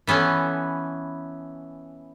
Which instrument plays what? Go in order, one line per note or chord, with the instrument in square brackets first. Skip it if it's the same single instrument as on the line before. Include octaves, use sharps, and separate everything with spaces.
[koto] E3 B3 C#4 A4